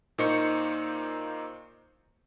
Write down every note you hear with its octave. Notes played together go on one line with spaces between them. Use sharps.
A#2 A#3 D#4 C5 C#6 C#7